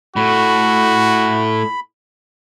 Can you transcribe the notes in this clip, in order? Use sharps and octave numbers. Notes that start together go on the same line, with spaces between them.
A2 F#4 B5